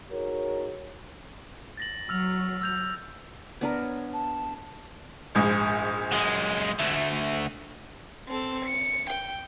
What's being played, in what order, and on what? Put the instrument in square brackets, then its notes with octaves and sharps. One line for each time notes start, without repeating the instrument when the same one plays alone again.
[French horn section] D#4 F#4 G#4 A#4 C#5
[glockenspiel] A6 A#6 F#7
[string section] F#3 [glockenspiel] E6 F6 F7
[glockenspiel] E6 G6 F7
[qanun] B3 D4 A#4 [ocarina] D5
[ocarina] C#5
A5
[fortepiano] A#1 G#2
[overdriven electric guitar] F#2 G#3
D2 A3
[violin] C4 A4
C#7
G5